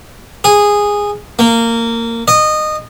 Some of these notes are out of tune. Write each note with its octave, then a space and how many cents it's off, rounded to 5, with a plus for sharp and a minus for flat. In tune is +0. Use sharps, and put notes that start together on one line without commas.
G#4 -10
A#3 -20
D#5 -20